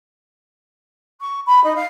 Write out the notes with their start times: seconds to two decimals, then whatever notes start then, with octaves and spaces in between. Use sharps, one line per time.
1.20 C#6
1.46 B5
1.63 D#4
1.75 F5